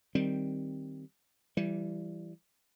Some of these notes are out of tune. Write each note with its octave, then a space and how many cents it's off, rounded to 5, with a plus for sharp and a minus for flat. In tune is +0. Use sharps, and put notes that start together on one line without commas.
D#3 +0 G3 +0 C4 +0
E3 +25 G3 +0